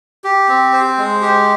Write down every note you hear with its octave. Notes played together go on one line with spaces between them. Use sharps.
G4
C4
C5
G#3
G4